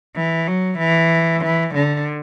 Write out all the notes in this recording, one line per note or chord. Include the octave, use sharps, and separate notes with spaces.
E3
F#3
E3
E3
D3